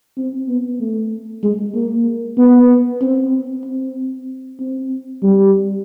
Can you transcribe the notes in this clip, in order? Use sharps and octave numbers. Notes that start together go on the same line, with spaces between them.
C4
B3
A3
G#3
A#3
B3
C4
C4
C4
G3